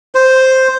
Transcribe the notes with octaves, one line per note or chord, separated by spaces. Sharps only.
C5